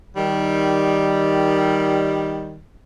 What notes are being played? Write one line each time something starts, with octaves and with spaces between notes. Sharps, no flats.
D#3 G3